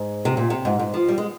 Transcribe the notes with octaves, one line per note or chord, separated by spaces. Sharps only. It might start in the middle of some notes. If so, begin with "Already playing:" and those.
Already playing: G#2
C3
A#2
C3
G#2
G#2
F3
G3
G#3